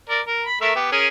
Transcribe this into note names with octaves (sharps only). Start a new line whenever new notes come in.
A#4 D5
A#4
B5
A3 A#4 E5
B3 G4
C#4 G#4 A#4